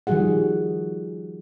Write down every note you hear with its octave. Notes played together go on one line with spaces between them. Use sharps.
D#3 F3 G3 F#4 G#4 F#5